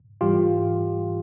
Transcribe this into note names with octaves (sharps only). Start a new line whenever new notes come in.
G#2 E3 G3 F4 G4